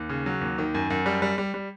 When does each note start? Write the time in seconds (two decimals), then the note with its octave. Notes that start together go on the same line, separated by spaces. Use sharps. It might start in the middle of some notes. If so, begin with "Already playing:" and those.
Already playing: D#2
0.09 C#3
0.26 F#3
0.41 D#2
0.58 D#3
0.74 F#2
0.90 F#2
1.06 G3
1.22 G3
1.38 G3
1.54 G3